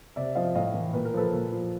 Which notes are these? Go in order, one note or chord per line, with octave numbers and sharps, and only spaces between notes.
C3 D5 E5
F3 D#5 F5
A2 D#5 F5
E3
A#2 B4
A#4
F3 A4 B4
A#2
F3